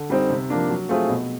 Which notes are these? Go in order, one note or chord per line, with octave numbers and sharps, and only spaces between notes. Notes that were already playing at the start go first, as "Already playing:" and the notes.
Already playing: D3
G3 C4 D#4
C3
F3 A#3 D4
F#3
A3 C4 F4 G#4
B2